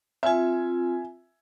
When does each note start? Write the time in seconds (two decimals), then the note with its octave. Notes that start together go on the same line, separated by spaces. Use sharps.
0.23 C4 F4 E5 G#5